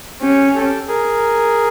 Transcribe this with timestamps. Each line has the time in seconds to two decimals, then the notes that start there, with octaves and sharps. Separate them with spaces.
0.22 C#4 G4
0.55 G4 A4
0.88 G#4 A#4